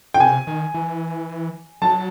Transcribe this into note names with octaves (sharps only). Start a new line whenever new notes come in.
G5
C3 G#5
D#3
E3
F#3 A5